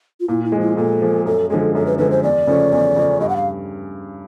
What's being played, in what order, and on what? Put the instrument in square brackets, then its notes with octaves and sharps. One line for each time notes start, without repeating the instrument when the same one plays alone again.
[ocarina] F4
[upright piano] A#2 [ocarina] E4
[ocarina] E4
[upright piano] G#3
[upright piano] F3 [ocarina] E4
[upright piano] A#2 [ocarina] A4
[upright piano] F3 G#3
[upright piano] F#2 [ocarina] A4
[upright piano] D3 F3 G#3 [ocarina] A4
[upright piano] F#2 [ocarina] A4
[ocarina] B4
[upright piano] D3 F3 G#3 [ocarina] B4
[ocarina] C5
[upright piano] E2 [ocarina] D5
[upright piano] C#3 F3 A3 C#4
E2
C#3 F3 A3 C#4
[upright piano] G2 [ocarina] D#5
[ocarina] F#5
F5